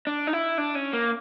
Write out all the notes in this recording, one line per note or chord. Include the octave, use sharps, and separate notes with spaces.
D4
D#4
E4
D4
C#4
A#3